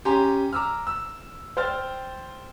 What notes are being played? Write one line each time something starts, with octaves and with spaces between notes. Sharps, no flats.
C#4 G4 G#5 A#5 C6
A#5 D6 E6 F6
E6
C5 G5 F6 A6